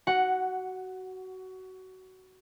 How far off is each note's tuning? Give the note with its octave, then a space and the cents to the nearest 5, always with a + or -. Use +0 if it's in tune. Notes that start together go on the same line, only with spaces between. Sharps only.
F#4 +20 F#5 +0